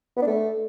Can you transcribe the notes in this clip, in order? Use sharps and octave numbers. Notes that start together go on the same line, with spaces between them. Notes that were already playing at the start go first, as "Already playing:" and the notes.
B3
D4
A3